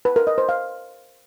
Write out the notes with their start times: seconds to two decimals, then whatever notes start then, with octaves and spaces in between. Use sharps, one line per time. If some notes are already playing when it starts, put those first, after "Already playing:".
0.05 B4
0.16 A#4
0.27 D#5
0.38 C5
0.49 F5